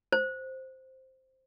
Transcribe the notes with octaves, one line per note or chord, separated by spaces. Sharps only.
C5